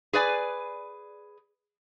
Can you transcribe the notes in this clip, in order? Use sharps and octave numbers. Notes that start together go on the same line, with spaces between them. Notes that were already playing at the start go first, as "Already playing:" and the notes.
G#4 B4 D5 G#5